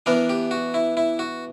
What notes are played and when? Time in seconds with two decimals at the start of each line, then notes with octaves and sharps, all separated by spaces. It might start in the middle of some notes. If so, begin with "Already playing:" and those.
0.06 E3 B3 D4 A#4
0.29 G4
0.51 F#4
0.74 E4
0.97 E4
1.19 F#4